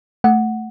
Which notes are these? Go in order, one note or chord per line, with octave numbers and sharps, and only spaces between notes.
A3 F#5